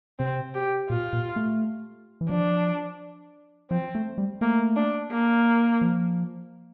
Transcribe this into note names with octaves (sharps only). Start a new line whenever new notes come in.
C3 C4
G4
A#2 F4
A#2
A3
E3
F3 D4
F3 C4
A3
G3
A3 A#3
D4
A#3
F3